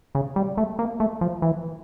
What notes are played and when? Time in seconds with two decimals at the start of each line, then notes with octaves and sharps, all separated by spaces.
0.15 C#3
0.36 G3
0.57 A3
0.79 A#3
1.00 A3
1.21 F3
1.42 E3